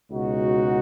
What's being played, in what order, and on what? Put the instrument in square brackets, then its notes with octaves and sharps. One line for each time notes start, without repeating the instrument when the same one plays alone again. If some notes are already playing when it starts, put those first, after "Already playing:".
[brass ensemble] C#2 B2 G#3 D#4 F#4